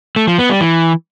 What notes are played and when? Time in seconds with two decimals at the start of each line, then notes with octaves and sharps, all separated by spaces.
0.16 A3
0.27 F3
0.39 B3
0.50 G3
0.61 E3